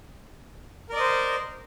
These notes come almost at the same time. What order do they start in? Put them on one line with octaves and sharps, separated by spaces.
A#4 D5 D#5 C5